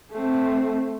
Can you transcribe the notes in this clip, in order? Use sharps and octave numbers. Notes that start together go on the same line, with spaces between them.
A3 C4